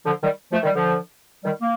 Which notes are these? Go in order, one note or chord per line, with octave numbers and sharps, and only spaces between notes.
D3 F3
D#3 G3
F3 A3
D#3 G3
D3 F3
D#3 G3
A#3